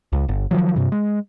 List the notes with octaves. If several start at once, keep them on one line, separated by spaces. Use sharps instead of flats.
C#2
G1
D#3 F3 F#3
G2 C3
G#3